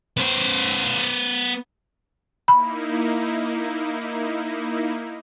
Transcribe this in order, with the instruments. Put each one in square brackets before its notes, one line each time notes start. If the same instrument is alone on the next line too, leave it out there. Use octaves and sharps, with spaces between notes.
[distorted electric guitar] B3 C5
[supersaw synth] A#3 D#4 E4 [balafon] B5